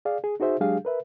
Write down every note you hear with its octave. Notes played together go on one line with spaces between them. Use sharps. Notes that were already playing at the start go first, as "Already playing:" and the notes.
G#4 D5 F5
G#4
D#4 F#4 G#4 C5 E5
F#3 G#3 D4 G4 G#4 F5
A#4 B4 E5